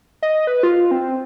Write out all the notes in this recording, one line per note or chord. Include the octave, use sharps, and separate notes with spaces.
D#5
B4
F4
C4